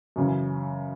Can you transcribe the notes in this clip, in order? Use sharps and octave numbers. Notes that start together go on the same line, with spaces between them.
F#2 C#3 E3